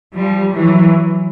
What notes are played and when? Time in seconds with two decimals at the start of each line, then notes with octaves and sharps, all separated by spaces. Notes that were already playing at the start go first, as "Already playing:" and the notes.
0.16 F3 G3
0.55 E3 F#3